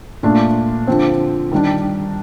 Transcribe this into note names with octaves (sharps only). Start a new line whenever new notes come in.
A#2 A3 D4 F4
D3 F3 C4
D#3 G3 D4